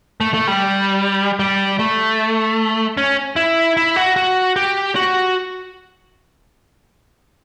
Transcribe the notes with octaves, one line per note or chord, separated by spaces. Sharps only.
A3
A3
G3
G3
A3
C#4
E4
E4
F#4
F#4
G4
F#4